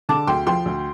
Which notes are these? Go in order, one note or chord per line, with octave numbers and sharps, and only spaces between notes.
D3 A5 D6
D2 G5 C6
F3 G5 C6
D2